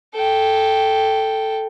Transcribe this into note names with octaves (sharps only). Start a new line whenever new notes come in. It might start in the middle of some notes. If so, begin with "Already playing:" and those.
A4 G5